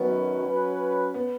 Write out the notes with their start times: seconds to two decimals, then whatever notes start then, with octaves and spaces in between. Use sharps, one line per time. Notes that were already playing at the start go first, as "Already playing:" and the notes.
Already playing: F#2 D#3 F#3 B3 C#4 B4
0.43 F#3 C#4 B4
1.14 B3